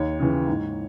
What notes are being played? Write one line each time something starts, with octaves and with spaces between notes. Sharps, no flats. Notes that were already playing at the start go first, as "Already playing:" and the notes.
Already playing: D#2 C#5
C#3 E3
G#2